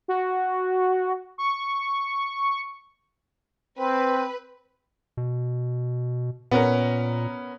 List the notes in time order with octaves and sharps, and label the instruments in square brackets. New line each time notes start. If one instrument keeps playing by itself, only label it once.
[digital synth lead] F#4
C#6
[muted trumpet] C4 [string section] B4
[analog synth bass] B2
[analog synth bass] A#2 [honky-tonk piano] B3 C#4 A#4